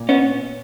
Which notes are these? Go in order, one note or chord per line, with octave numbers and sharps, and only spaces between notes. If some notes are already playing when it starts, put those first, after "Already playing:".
Already playing: A#2
B3 C#4